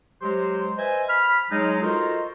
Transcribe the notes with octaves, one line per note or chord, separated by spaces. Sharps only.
F#3 G#3 G4 C5
B4 C5 D#5 E5 G#5
B5 F6
F#3 G#3 D#4
F4 F#4 A4 A#4 C5 D#5